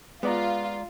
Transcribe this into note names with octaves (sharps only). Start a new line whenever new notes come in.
G#3 B3 F4 D5 A#5